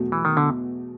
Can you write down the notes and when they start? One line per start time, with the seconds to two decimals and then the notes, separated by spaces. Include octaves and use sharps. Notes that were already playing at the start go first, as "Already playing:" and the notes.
Already playing: E2 B2 F#3 A3
0.12 E3
0.25 D#3
0.37 D3